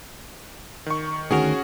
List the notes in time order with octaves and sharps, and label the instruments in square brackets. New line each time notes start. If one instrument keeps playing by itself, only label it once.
[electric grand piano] D#3 C#6
[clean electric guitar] D2 D#3 A#4 [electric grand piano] C#4 F#4 G#4